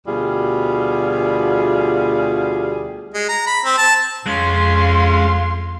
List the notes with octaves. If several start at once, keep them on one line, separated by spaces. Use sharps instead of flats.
D2 B2 G3 F4 G#4
G#3
A#5
B5
C4
A5
F2 G#3 C#4 F5 C6